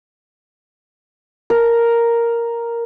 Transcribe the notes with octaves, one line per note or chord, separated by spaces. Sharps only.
A#4